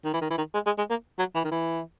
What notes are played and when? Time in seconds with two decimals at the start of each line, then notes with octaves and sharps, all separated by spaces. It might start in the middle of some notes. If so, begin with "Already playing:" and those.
0.05 D#3
0.13 E3
0.21 D#3
0.30 E3
0.38 D#3
0.54 G#3
0.66 G#3
0.78 G#3
0.90 A#3
1.19 F#3
1.35 E3
1.44 D#3
1.52 E3